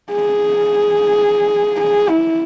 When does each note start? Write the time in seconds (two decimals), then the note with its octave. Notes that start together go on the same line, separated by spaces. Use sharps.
0.12 G#4
1.81 G#4
2.09 E4